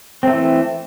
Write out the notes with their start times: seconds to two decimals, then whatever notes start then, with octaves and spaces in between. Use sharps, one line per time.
0.23 C4
0.27 A3
0.32 E3